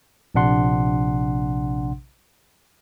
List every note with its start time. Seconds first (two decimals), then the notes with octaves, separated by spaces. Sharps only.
0.35 A#1 C3 D4 F#5 C6